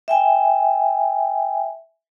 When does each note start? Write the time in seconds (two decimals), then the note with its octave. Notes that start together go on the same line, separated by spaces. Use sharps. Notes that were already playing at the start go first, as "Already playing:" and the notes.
0.08 E5 G5 G#5